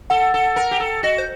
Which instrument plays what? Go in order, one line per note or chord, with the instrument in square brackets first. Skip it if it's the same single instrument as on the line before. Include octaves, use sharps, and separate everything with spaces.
[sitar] A4 [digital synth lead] F#5
[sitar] A4
A#4
G4
A4
[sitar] F#4 [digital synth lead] D#5
[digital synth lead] C5